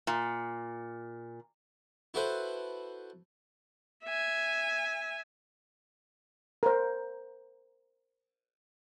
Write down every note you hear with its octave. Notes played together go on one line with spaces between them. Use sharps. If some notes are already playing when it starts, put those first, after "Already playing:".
A#2
E4 F#4 A4 B4 C5
E5 G#5
A#4 C5